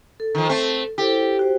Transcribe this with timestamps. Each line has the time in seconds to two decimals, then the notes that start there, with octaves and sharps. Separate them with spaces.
0.20 A4
0.35 D#3 F3
0.49 A3 C4
0.98 E4 G4 A4 C5
1.39 F#4 C5